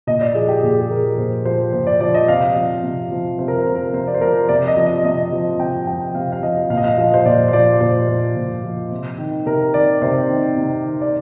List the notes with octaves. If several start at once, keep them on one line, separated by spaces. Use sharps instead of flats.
A#2 D#5
D5
F3 G#4
G4
A#2 G#4
G#4
F3 A#4
A#2 C5
F3 C5
A#2 C5
D5
F3 D5
D#5
C3 F5
F3
C3
F3
C3 C5
A#4
C5
F3
A#4
C3 C5
D5
C5
F3 A#4
C3 D5
D#5
F3
D#5
C3 D#5
F3
C3 G5
F3 G5
C3 F5
F5
F3 D#5
A#2 F5
D#5
F5
F3 D#5
C5
A#2 D5
C5
F3 D5
A#2 C5
F3 C5
A#2
F3
C3
D#3
C3 A#4
D#3 D5
C3 C5
D#3
C3
D#3
D5